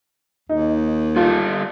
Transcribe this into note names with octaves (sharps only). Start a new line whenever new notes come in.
D#2 D#4
G3 F4 A4